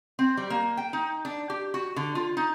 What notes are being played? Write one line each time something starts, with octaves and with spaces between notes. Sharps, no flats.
C4
G3
A#3
G5
D#4
D4
G4
F#4
D3
F4
D#4